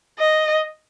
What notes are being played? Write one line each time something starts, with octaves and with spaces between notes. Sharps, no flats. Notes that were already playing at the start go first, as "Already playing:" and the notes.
D#5